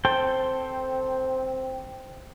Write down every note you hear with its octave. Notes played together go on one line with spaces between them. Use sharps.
C4 A4 C5 G5